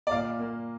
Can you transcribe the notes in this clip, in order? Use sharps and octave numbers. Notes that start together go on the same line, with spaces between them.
D5
A#2 F5
A#3